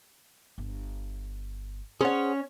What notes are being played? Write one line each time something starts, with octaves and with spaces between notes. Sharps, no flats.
G1
C#4 G#4 C5 C#5 F#5